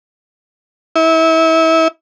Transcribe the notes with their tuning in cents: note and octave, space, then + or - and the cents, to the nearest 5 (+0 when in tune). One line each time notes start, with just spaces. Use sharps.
E4 -30